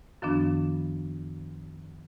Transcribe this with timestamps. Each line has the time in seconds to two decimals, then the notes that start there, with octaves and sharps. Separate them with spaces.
0.22 F#2 D#3 F3 B3 D4